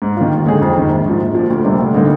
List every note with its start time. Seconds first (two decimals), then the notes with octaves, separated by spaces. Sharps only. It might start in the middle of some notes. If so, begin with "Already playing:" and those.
0.02 G#2
0.17 D#3 A#3 F4
0.32 D#2
0.45 D3 G#3 D#4 G#4
0.61 F2
0.76 D#3 G#3
0.90 A#1
1.06 G#2 F3
1.20 A#1
1.35 A#2 F3
1.50 D2
1.65 C3 G3 A#3 D4
1.79 D2
1.94 D3 G3 A#3 D#4